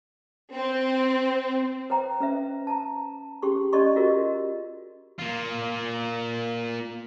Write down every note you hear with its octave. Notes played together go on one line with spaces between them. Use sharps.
C4
B4 C5 G5 A#5
C#4 B4 E5
A5 A#5
C#4 G4 G#4 C6 C#6
C#4 G4 D5 D#5 C6 C#6
F4 F#4 G#4 A#4 D#5
A#3 F4